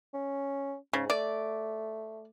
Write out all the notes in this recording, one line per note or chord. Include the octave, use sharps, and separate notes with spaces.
C#4
G#2 C#3
A3 D5